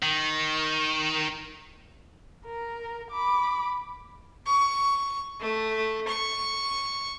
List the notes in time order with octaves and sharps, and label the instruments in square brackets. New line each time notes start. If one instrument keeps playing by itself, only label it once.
[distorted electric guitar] D#3
[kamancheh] A#4
B5 D6
[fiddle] C#6
A3
C#6